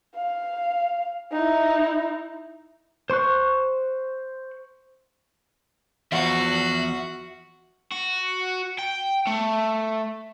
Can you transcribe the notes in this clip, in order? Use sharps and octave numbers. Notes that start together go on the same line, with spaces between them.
F5
D#4 E4
C5 C6 C#6 F#6
E2 F3 F#4 E5 F#5
F#4
G5
A3